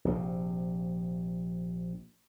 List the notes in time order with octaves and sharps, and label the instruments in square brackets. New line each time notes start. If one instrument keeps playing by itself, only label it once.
[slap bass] A#1 C3